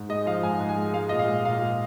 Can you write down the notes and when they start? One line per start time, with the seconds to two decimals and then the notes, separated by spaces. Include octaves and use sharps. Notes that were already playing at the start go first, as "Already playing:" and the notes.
Already playing: G#2
0.09 G#3 D#5
0.26 F3 F5
0.43 G#2 G#5
0.59 G#2
0.69 G#5
0.77 G#3
0.93 G#3 F5
1.09 A#2 D#5
1.19 F5
1.28 G#3
1.45 A#2 F5
1.62 G#3